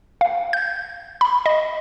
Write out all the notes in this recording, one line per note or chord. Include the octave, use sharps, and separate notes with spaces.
F5
G6
B5
D#5